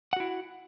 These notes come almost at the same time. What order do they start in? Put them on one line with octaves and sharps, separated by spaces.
F#5 F#4 E4